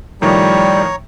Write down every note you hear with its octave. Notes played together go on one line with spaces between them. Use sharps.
A2 D#3 F3 G3 C#5 A#5